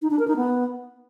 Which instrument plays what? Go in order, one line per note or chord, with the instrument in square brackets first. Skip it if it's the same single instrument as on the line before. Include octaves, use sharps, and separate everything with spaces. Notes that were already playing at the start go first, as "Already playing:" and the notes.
[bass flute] D#4
D4
A#4
D#4
B3